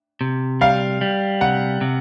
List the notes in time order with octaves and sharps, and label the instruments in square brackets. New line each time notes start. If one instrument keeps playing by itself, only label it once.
[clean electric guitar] C3
[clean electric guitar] G3 [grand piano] F5
[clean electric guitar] G3
[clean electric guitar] C3 [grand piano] F#5
[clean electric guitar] C3